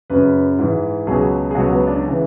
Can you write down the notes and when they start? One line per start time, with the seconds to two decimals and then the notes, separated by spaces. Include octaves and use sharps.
0.10 F#2 C#3 F#3 B4
0.59 G#2 E3
1.07 C#2 B2 F#3 G#4
1.51 G#4
1.55 C#2 B2 F#3 F#4
1.71 B3
1.87 D4
2.06 C#3 E3